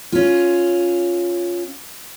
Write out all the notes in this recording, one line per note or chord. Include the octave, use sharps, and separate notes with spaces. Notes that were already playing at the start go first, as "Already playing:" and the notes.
C#4 F4